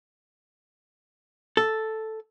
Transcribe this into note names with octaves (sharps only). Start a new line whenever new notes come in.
A4